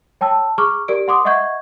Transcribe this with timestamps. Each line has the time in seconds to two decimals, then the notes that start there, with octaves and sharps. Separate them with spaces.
0.21 C#5 G5 A5 E6
0.58 G#4 A#5 C#6 D6 F6
0.88 G4 A#4 D5 D7
1.08 F#5 C6 D6 D#6
1.25 D#5 E5 F#5 C#6 G6 G#6